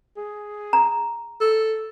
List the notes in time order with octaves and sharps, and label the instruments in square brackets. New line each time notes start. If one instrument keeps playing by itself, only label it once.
[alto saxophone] G#4
[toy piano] A#5
[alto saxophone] A4